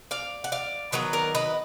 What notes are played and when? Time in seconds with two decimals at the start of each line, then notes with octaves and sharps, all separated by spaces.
0.11 D5 F5
0.44 F#5
0.52 D5 F5
0.92 D#3 F#3 B3 B4 D#5
1.13 A#4 D5
1.35 B4 D#5